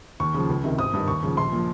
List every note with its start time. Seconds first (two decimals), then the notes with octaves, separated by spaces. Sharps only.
0.20 D#2 C#6
0.34 C#3 F3
0.49 C#2
0.64 C3 D#3
0.78 G#1 D#6
0.93 G2 D#3
1.08 D#2 C#6
1.23 C#3 F3
1.37 A#1 C6
1.52 A#2 F3